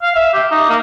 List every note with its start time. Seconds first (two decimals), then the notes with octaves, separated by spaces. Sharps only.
0.02 F5
0.16 E5
0.34 G4
0.51 D#4
0.69 A#3